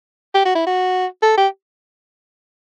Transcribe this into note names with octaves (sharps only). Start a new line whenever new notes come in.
G4
F#4
E4
F#4
A4
G4